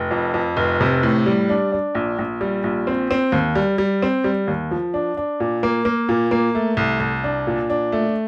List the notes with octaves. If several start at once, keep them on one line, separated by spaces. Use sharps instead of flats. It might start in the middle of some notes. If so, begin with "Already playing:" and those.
Already playing: F1
F2
F2
F1
C3
A2
G3
D4
D4
A#1
A#1
G3
A#1
C4
C4
D#2
G3
G3
C4
G3
D#2
F3
D4
D4
A#2
A#3
A#3
A#2
A#3
A3
C2
C2
D4
A#2
D4
A3